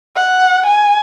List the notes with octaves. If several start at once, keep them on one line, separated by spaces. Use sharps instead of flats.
F#5
G#5